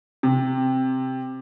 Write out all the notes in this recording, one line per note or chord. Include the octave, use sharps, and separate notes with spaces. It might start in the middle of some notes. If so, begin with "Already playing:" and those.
C3